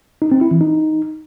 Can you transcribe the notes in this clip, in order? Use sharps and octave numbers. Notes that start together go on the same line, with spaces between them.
D#4
C4
E4
E3
D#4